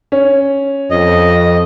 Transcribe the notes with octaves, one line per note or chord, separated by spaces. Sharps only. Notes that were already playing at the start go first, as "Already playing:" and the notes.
C#4
F2 D#5